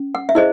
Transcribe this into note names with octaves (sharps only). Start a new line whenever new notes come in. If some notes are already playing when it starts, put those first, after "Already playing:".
Already playing: C#4
F#5
E5
E4 G#4 C5 D#5